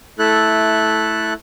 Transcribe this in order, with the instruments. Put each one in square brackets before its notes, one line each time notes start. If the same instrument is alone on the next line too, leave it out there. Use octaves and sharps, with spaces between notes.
[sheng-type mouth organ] A3 E4 A4 F#6